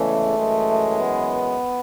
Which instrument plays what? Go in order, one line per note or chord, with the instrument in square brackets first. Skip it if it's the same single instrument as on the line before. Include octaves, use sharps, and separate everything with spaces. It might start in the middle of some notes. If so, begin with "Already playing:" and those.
Already playing: [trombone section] E2 C#3 E3 G#3 A3
F#2 E3 G#3
B3